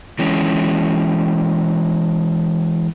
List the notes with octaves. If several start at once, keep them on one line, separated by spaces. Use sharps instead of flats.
E3 G#3 C#4